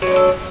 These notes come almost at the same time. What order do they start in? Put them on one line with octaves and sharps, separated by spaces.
F#3 G#3 D4 A4